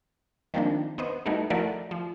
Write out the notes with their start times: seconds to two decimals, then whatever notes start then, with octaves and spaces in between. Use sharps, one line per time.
0.54 D#3 F3 G3 A#3 C4 D4
0.98 B3 C5 D#5
1.26 G3 A3 B3 D#4 E4 F#4
1.50 F3 A3 E4 F#4 A#4 D5
1.91 F3